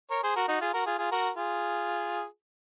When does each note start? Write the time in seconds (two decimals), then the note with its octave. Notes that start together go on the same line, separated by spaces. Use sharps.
0.10 A#4 C#5
0.23 G#4 C5
0.36 F#4 A#4
0.48 D#4 F#4
0.61 F4 G#4
0.74 F#4 A#4
0.86 F4 G#4
0.98 F4 G#4
1.12 F#4 A#4
1.36 F4 G#4